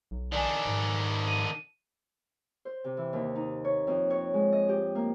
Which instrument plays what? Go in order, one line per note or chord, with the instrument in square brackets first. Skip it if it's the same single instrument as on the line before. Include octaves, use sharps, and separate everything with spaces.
[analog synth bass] B1
[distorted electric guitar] D#3 D4 [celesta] D5 G#5
[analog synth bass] G#2
[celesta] D#7
[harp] C5
C3
E3
D#2
D#4
C#5
F2
C#5
G#3
D#5
G4
A#3